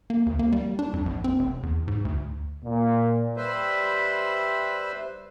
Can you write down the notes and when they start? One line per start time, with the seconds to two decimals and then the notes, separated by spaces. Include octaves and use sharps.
0.10 A#3
0.26 D2
0.39 A#3
0.52 G3
0.79 D4
0.93 F2
1.06 A#1
1.24 C4
1.39 F1
1.63 E2
1.88 G#2
2.05 D2
2.63 A#2
3.37 G3 B4 C5 E5